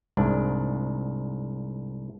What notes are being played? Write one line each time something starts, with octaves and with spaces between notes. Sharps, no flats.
C2 G#2 D4